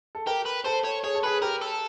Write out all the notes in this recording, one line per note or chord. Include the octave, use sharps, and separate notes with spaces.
A4
G4 A#4
B4
A4 C5
C#5
G#4 C#5
A4
G#4 B4
G4 A#4
A4